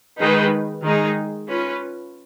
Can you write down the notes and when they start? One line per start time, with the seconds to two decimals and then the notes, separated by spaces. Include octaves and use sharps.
0.20 D#3 G#3 D#4 G#4 B4
0.83 D#3 G#3 D#4 G#4
1.48 C#4 F4 B4